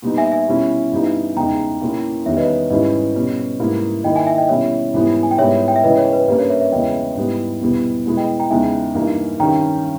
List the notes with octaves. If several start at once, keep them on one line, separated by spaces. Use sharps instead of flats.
A#2 G3 B3 D#4
E5 G#5
E5 G#5
B2 G3 C#4 E4
G2 E3 G3 B3 D#4
E2 C#3 G#3 D#4 G5 A#5
A#2 A#3 C#4 E4
E2 D#3 G3 C#5 E5
B4 D#5
B4
B4
G#2 E3 G3 C#4 E4 B4 D#5
B2 G3 C#4
G#2 G3 A#3 E4
D#3 A#3 E4 D#5 G5
E5 G#5
E5 G#5
D#5 G5
B2 G3 C#4 E4 C#5 E5
G#2 E3 G3 B3 E4
G#5
G5
G#2 G3 B3 E4 C#5 E5
G5
E5
C#3 E3 G#3 B4 D#5
C#5
B4
G2 G3 A#3 C#4 B4
C#5
C#5 E5
C#5 E5
E2 C#3 E3 G#3 D#5 G5
G#2 G3 B3 E4
E2 B2 G3 B3 E4
B2 G#3 B3 E4
D#5 G5
G5 A#5
E2 C#3 G#3 D#4 E5 G#5
G2 E3 A#3 D#4
G2 D#3 G3 C#4 G5 A#5